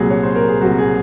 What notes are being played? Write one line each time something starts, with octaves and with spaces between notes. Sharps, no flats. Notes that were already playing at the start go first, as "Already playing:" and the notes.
Already playing: C2 A#2 F#3 G#4
C#5
C5
A#4
G#4
C2 A#2 F#3 F#4
G#4